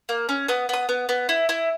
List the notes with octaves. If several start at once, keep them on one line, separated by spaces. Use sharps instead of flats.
A#3
C#4
B3 D#6
B3 D#6
B3
B3
E4
E4